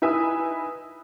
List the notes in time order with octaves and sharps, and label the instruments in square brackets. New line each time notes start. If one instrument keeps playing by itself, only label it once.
[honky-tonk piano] D#4 E4 B4 E5 G#5 D#6